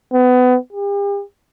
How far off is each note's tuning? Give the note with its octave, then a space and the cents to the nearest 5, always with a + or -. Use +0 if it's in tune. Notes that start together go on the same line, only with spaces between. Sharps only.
B3 +25
G4 +40